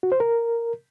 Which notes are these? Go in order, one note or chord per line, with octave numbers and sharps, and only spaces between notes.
F#4
C5
A#4